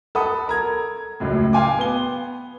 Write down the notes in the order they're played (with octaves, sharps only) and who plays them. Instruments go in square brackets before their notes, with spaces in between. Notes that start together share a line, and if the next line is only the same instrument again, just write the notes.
[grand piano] A4 F#5 B5 D#6
A#4 A#5 G#6
C#2 F#2 A2
F5 G5 G#5 C6 D6
B3 G7